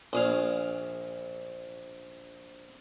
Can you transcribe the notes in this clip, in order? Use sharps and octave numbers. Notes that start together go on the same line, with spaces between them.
A#1 G#4 F5